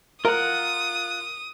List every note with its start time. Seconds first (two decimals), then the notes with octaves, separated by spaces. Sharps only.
0.25 F4 A#4 F#5 D#6